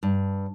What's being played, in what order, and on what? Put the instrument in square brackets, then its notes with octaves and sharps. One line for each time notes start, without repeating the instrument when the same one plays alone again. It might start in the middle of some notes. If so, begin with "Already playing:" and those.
[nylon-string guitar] G2